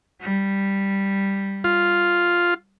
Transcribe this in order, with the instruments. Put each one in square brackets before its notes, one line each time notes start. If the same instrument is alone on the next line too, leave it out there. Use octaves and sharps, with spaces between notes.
[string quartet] G3
[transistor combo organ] F4